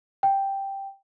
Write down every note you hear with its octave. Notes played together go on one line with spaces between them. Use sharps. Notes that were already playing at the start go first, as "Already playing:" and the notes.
G5